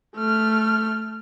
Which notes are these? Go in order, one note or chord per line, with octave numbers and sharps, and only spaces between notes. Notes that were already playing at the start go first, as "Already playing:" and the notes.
A3 F6